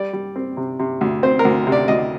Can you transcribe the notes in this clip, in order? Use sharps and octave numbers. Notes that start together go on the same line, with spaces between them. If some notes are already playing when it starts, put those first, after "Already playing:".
Already playing: G3 D5
G3
C4
C3
C3
D2
C4 C5
A#4
D2
C3
D5
D2 D#5